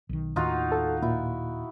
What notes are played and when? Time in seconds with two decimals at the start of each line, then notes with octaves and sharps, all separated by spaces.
0.09 B1 D#3
0.36 D#2 A2 D#3 D#4 F4 F#4
0.72 A4
1.02 A#2 E4